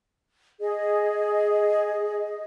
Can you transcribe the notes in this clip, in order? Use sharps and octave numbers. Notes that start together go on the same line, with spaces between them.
G#4 D#5